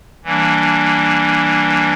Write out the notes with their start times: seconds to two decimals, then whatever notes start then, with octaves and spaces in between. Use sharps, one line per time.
0.25 E3 G3 A#3 D4